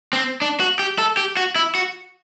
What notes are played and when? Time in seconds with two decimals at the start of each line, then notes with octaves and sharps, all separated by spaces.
0.13 C4
0.42 D4
0.60 F#4
0.79 G4
0.98 A4
1.17 G4
1.37 F#4
1.56 E4
1.75 F#4